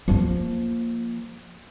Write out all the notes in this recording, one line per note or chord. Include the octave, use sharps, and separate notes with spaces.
F3 A#3